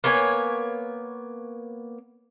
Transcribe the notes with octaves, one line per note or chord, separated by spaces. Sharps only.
A#3 B3 C#5 G#5